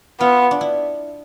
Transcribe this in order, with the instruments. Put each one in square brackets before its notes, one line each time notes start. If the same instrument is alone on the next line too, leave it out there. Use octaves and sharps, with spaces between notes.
[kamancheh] B3 [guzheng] F4
[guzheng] D4
E4